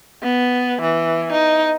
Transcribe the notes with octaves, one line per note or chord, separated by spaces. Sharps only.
B3
E3
D#4